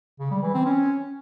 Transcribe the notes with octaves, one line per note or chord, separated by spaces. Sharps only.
C#3
G3
E3
C4
C#4